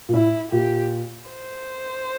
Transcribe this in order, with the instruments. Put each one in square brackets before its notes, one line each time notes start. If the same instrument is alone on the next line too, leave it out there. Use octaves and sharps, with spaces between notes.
[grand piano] A#2
[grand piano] A2 [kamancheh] E4
[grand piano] A#2 [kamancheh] G4
[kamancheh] C5